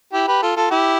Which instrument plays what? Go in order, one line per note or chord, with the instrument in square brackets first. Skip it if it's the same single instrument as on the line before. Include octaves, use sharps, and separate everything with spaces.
[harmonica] E4 G4
G4 B4
F4 A4
F4 A4
E4 G4